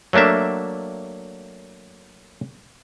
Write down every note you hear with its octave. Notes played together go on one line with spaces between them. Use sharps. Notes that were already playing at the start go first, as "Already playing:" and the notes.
F#3 A3 A#3 D4 E5